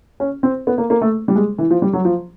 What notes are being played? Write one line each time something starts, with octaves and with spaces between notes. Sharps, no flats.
C#4
C4
B3
A#3
A#3
A3
G3
G#3
E3
F3
G3
F#3
F3